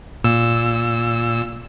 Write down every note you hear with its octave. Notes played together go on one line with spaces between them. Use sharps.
A#2 E6